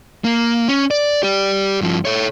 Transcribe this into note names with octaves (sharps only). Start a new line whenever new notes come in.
A#3
C#4
D5
G4 D5
G2 F3
A4 C#5